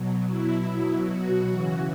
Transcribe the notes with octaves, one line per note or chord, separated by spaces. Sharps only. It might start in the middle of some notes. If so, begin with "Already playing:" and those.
Already playing: B2 F#3
E4
B2 F#3
F#4
C#3 E3